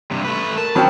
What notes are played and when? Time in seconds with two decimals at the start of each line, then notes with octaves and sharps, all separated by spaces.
0.11 G2 C3
0.25 A3 B4
0.58 A#4 A5
0.75 F3 F#3 C#4 G5 B5